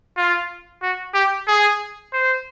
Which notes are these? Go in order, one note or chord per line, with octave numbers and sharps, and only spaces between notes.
F4
F#4
G4
G#4
C5